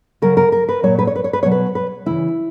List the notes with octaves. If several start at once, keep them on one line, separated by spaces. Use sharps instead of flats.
C#3 F#3 A#4
A#4
A#4
B4
A#2 F#3 C#5
B4
C#5
B4
C#5
B4
B2 F#3 C#5
B4
B4
C#3 E3 E4